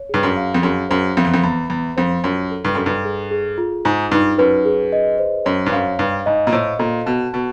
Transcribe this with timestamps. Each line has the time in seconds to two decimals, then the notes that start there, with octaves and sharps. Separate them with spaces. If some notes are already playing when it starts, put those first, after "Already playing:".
Already playing: C#5
0.09 G2 G#4
0.23 F#2
0.36 F5
0.54 F2
0.63 F#2 G#4
0.89 F#2 C5
1.17 F2 E5
1.25 E2
1.34 F2
1.43 E2 B5
1.70 E2 B5
1.97 F2 C5
2.24 F#2 F4
2.51 A4
2.65 G2
2.75 F#2 A4
2.86 G2
3.05 G#4
3.31 G#4
3.58 F4
3.85 G#2 D#4
4.11 G2 D#4
4.38 F#2 B4
4.65 G#4
4.93 D#5
5.18 C5
5.45 F#2 C#5
5.66 G2
5.72 F#2 F5
5.99 G2 F5
6.26 G#2 D#5
6.47 A#2
6.52 A2 C5
6.79 A#2 A4
7.06 B2 A5
7.33 B2 A5